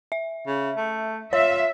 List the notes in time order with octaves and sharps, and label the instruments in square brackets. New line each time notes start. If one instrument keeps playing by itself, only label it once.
[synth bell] E5
[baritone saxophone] C#3
A3
[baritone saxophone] F4 [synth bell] C#5 [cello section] E5